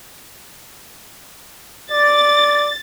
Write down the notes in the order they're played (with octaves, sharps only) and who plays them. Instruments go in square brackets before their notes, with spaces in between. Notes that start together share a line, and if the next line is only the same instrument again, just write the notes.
[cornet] D5 [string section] A6